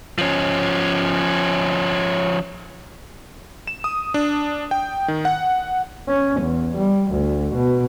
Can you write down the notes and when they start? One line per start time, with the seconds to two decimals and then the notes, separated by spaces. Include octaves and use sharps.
0.18 F3 C#4
3.67 E7
3.84 D#6
4.14 D4
4.71 G5
5.08 D#3
5.25 F#5
6.08 C#4
6.41 E2
6.77 G3
7.12 D2
7.55 B2